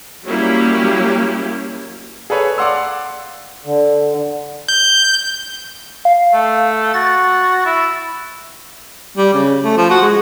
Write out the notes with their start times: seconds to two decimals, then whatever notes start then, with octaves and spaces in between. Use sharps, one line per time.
0.24 F#3 G3 A#3 C#4 E4 G4
2.30 G#4 A4 B4 C#5
2.58 D5 F5 F#5 C6 E6
3.65 D3
4.68 G6
6.05 F5
6.33 A3
6.94 F#4 A6
7.66 E4
9.17 G3
9.34 C#3
9.64 A3
9.77 F3
9.91 F#4
10.02 G#3